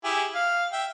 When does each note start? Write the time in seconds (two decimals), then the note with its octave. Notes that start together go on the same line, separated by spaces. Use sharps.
0.04 E4 G4 G#4
0.35 F5
0.73 E5 G5